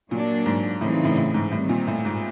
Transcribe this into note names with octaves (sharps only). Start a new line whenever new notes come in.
A#2 F#3 A#3 D4
G#2
A2 C#3 E3 G3 C4 D#4
A2
A2
G#2
A2 D#3 G3 C4
A#2
A2
G#2